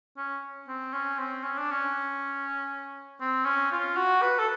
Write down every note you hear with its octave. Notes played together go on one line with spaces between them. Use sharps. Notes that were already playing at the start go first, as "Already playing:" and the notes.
C#4
C4
C#4
C4
C#4
D4
C#4
C4
C#4
F4
F#4
B4
A4